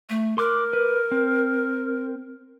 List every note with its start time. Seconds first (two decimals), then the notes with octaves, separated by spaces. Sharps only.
0.10 A3
0.38 A#4 C6 D6 F#6
0.73 B4
1.11 C4